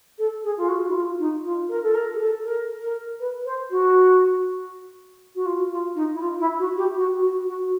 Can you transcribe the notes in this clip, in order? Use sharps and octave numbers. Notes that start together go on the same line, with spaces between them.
A4
G#4
F4
F#4
E4
F4
D#4
F4
A#4
A4
A#4
G#4
A4
A#4
A#4
B4
C5
F#4
F#4
F4
F4
D#4
E4
F4
E4
F#4
G4
F#4
F#4
F#4